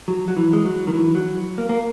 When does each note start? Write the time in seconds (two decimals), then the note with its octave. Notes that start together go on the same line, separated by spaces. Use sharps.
0.08 F#3
0.28 F#3
0.37 E3
0.53 G#3
0.65 F#3
0.87 D#3
0.93 E3
1.15 F#3
1.58 A#3
1.69 A#3